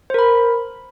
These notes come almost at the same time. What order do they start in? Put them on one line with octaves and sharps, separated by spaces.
C5 A#4 B5